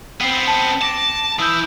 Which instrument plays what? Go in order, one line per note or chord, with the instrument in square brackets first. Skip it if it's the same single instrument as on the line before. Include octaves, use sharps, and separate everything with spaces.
[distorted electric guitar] B3 C4 [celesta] G5 C7
[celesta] A5
[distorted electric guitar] A5 [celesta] D6 A#6 D7
[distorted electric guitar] E3 E4 [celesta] D#6 E6 G6